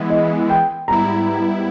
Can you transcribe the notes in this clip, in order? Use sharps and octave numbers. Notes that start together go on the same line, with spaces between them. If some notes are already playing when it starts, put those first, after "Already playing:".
Already playing: E3 G#3 B3 E4
D#5
G5
G#2 G3 B3 E4 A#5